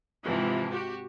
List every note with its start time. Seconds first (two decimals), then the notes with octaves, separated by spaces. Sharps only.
0.24 G#2 C3 E3 F3
0.70 F#4 G4